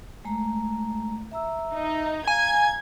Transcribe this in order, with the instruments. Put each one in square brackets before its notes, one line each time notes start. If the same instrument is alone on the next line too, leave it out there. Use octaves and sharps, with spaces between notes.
[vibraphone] G#3 A3 A#5
E5 A#5 E6
[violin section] D#4
[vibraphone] F5 A#5 [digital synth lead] G#5 [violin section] G#6